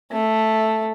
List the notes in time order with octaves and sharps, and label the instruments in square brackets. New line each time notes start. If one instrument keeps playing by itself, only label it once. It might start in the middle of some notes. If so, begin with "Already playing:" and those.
[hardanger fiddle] A3